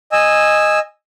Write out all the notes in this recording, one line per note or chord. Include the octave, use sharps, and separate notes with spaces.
D#5 G#5 E6